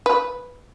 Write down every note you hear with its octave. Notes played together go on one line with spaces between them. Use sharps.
B4